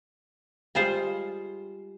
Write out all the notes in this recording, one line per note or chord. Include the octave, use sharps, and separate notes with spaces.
G3 G#3 F4 C5